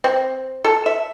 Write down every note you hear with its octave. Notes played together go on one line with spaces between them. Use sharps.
C4
A4
E5